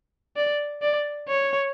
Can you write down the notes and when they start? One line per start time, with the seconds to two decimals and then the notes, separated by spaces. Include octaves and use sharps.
0.36 D5
0.82 D5
1.28 C#5